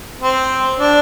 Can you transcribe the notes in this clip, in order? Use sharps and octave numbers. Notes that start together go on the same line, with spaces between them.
C4
D4